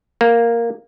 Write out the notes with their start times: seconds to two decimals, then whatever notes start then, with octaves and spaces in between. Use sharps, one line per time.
0.21 A#3